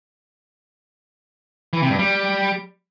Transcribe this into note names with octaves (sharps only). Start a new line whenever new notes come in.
E3
C3
G2
G3